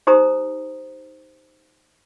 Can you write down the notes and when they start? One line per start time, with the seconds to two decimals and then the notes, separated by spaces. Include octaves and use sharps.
0.07 D#4 G4 C5 A#5 D#6